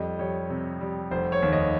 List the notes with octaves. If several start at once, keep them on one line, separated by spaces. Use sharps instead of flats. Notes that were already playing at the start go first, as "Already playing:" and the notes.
Already playing: F2 G3 D#5
G3 C#5
C3
G3
F1 C5
C#5
D#2
D#5